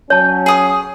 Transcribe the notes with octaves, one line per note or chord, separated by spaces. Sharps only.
F#3 C#4 C#5 A5
G#4 D#6